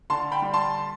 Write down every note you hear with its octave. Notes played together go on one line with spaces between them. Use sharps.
D3 A5 C6
G5 B5
G3
A5 C6